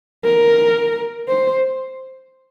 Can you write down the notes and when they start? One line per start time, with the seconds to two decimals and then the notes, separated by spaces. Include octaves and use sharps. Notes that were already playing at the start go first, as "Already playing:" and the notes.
0.24 A#4
1.28 C5